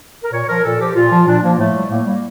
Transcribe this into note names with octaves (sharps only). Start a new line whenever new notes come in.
A#4
A#2 C#5
F3 A#4
A#2 A4
F3 G4
A#2 F4
F3
A#2 D4
F3 A#3
A2 A3
G3
A2 A#3
G3 A#3